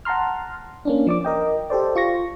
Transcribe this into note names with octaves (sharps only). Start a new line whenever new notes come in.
F#5 A5 A#5 C6 F6
A#3 C#4 D4
F3 D5 D6
A#4 D#5 G5
G4 A4 C5 D5
F4 C#6 A#6